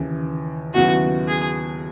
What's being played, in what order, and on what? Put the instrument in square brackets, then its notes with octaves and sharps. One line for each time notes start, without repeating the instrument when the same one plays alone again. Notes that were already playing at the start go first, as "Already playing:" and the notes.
Already playing: [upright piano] D#2 C#3 E3
[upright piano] D#2 C#3 F#3 B3 E4 [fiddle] F#4
[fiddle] G#4